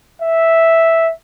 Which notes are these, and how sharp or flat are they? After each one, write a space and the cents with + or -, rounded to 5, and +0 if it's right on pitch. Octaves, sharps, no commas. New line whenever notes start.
E5 -5